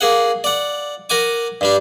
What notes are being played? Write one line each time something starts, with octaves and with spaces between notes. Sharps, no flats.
A#3 G#4 F#5
D5 F#5
A#4 F#5 G#5 D6
G2 G3 D4